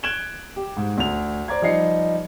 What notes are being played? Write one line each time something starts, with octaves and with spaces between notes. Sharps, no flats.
F#6 G#6 D7 E7 F#7 G7
G4
G#2
D2 F7
C5 D5 A#5 G#6
F3 G3 D#4 C7 C#7